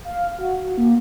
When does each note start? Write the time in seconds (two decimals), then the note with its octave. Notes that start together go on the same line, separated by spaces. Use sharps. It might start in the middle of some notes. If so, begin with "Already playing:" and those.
0.05 F5
0.39 F#4
0.61 F#4
0.78 A#3